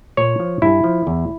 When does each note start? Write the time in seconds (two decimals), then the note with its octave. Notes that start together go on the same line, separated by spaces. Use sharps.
0.17 A#2 C#5
0.40 F3
0.62 G2 E4
0.84 F3
1.07 E2